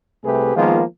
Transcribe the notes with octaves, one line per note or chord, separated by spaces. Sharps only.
C2 C3 A3 G4 G#4 B4
D#3 F3 G#3 A#3 B3 F4